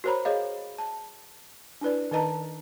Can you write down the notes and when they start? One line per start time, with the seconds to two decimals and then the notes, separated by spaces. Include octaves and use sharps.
0.04 F#4 A#4 C5 C#5 A#5 B5
0.25 G#4 C#5 D#5 F5
0.78 A5
1.81 D4 E4 B4 D5
2.11 D#3 D#4 B4 D#5 A5 A#5